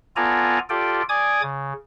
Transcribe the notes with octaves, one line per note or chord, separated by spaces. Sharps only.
B3 F4 A4 D5 G#5 A#5
F4 G4 A4 D5 G5
D5 G#5 D6 D#6 G#6
C#3